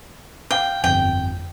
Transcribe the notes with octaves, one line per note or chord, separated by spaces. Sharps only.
F5 G5
G1 F2 G5